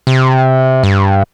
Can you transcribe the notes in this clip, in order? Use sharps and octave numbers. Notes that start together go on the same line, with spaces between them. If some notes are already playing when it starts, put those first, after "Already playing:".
C3
G2